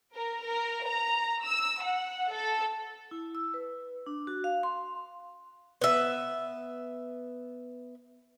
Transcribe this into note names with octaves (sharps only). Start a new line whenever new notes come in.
A#4
A#4
A#5
E6
F#5
A4
E4
E6
B4
D4
F#4
F5
C6
B3 E5